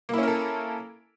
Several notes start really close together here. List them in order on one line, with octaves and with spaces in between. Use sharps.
A#3 E4 C#4 A#4 A4